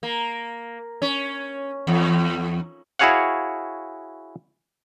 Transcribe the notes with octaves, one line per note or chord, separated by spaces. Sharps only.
A#3
C#4
E2
E4 F#4 G#4 C#5 F5 F#5